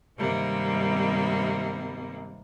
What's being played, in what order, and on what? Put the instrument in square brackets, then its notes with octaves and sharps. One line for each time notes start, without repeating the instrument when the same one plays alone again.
[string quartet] G2 C3 D#3 G3 G#3 A#3